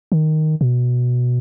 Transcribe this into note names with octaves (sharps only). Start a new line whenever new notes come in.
D#3
B2